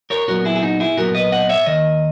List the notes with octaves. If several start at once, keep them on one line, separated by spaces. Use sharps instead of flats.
A#4 C#5
A#2 F#3 B3 F#4 A#4
E4 G#4
G#4
D#4 F#4
E4 G#4
A#2 F#3 B3 F#4 A#4
B4 D#5
D#5 F#5
C#5 E5
D#2 D#3 D#5